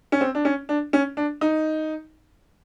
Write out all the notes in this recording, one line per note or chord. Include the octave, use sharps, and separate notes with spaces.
C#4
C4
D4
C#4
D4
C#4
D4
D#4